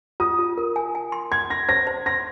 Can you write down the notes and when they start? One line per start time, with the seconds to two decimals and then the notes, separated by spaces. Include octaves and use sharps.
0.20 F4 D#6
0.39 F4
0.57 A#4
0.76 G#5
0.95 G#5
1.12 C6
1.32 C6 G#6
1.50 C6 A#6
1.69 C5 A#6
1.87 C5
2.06 C6 A#6